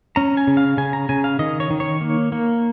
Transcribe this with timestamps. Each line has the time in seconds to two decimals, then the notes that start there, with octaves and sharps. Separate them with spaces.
0.16 C#4 A#5
0.37 G#5
0.47 C#3
0.57 F5
0.78 C#3 G#5
0.93 A#5
1.09 C#3 G#5
1.24 F5
1.39 D#3 D#5
1.60 C#5
1.70 D#3
1.80 C#5
2.01 A#3
2.32 A#3